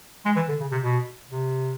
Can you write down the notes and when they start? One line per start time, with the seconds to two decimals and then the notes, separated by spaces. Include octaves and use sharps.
0.26 G#3
0.36 E3
0.49 D3
0.60 C#3
0.72 C3
0.84 B2
1.30 C3